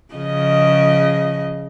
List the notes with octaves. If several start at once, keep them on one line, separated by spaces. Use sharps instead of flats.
C#3 F3 D#5